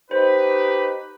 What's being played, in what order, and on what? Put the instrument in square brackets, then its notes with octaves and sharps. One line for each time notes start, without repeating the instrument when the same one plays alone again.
[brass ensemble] D#4 G4 B4 [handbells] C5